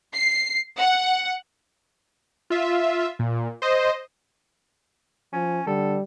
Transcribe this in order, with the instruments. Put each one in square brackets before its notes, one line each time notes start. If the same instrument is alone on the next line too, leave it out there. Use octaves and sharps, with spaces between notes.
[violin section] C7
F#5
[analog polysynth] F4 E5
A#2
C5 D#5
[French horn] F3 [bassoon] C#4
[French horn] D3 [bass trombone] G3 [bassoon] A4